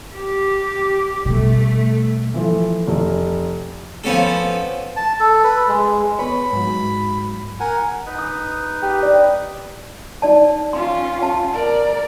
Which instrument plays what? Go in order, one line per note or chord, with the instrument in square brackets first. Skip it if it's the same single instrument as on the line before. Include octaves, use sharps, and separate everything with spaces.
[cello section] G4
[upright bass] B2 G3 [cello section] A3
[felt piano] E3 F3 A4
F1
[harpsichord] F3 B3 C#4 A4
[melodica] A5
A4
B4
G#3
[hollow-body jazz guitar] B3 B4 C#5 [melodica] B5
[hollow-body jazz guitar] G#2 F#3
[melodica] A#4 F#5 G#5
[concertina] D#4 B4
[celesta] D#6
[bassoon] G4
[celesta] D5
[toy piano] D#4 D5 A5
[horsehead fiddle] C#4 F4 [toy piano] C6
[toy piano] F#5 A5
[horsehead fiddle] A#4 D5